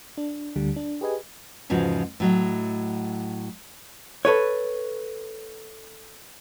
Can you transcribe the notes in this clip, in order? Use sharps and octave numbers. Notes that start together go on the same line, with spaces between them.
D4
D2 D3 G3
D4
G4 G#4 B4 D#5 G#5
E2 G#2 C#3 F3 F#4
A2 F#3 D#5
A4 B4 C#5